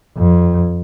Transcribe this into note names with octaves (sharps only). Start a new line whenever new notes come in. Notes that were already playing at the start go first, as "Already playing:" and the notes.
F2